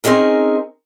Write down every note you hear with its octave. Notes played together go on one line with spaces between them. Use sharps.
C4 C#4 D#4 G#4 A#4